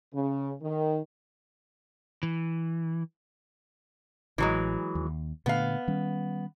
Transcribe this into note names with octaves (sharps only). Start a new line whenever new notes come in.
C#3
D#3
E3
A1 E3 F#3 G#3
D#2
A#2 D3 A3 B3 F5
D#3 G3 C#4